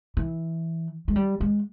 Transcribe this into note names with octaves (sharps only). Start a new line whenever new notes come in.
E3
G#3
G3
G#3